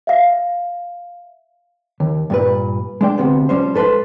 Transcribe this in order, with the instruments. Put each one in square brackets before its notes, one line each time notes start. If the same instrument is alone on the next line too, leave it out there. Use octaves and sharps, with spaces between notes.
[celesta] E5 F5
[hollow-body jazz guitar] D#2
G2 A#2 B4
G#3 D4 G5
D2 C3 B3
F3 G3 C#4 C5
G#2 A4 B4 A5 C6